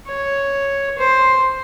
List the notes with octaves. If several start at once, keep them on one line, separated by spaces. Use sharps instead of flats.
C#5
C5